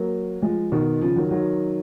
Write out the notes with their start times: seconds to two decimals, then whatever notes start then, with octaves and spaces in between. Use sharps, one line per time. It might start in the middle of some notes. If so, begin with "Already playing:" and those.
Already playing: F#3 A#3
0.42 F3 G#3
0.72 B2 D#3
1.02 C#3 F3
1.16 D#3 F#3
1.31 D#3 F#3